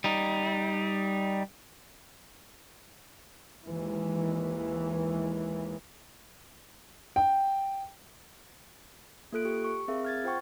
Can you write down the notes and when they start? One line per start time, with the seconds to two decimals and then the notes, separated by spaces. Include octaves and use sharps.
0.04 G3 D#4
3.66 D#2 E3 G#3
7.16 G5
9.32 A#3 F4 A4 F#6 D7
9.45 G4
9.64 C#6
9.88 C4 G#4 A#4 E5 F5
10.05 F6 G#6 A6
10.24 F4 C5 F#5 G5 C#6